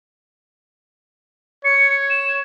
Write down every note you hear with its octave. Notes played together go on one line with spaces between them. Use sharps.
C#5 C#7
E7